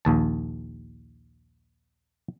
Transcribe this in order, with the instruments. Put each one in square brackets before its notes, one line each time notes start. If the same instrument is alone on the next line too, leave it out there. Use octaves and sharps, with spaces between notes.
[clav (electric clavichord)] A#1 D#2 A5